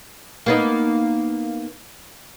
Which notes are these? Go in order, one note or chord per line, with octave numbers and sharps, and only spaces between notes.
A#3 B3 D#4